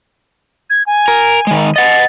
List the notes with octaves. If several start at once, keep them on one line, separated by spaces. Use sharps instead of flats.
G#6
G#5
A#4
D#3 G#3
D#5 F#5 A6